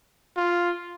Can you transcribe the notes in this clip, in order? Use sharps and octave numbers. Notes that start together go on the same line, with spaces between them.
F4